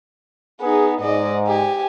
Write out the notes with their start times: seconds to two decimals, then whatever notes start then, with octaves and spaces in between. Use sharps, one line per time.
0.61 B3 D#4 G#4
1.01 G#2 D5 D#5
1.47 G4 G#5